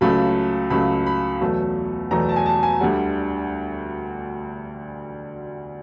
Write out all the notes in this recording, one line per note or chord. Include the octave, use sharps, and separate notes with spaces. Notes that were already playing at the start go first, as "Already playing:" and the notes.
C#2 C#3 F#3 A3 B5
C#2 C#3 F#3 A3 B5
B5
E2 B2 F#3 A3
E2 B2 F#3 A3 A#5
A5
G#5
A5
G#5
D2 D3 G3 F#5